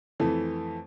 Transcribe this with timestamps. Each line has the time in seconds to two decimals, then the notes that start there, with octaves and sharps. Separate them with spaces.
0.20 F2 E3 A3